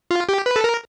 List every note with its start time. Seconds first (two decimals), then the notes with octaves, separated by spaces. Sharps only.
0.11 F4
0.29 G4
0.46 B4
0.56 A4
0.64 A#4